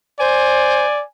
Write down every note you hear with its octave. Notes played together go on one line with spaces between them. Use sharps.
C5 D5 G#5